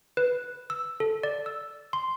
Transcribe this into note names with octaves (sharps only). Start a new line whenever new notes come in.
B4
E6
A4
D5
E6
C6